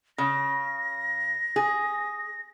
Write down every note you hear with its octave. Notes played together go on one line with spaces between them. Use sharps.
C#3 A#6
G#4